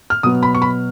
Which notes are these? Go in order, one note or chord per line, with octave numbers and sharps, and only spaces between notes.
F6
B2 F#3 B3 D#6
B5
C#6
B5